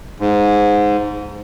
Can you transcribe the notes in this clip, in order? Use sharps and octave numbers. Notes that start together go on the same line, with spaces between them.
G#2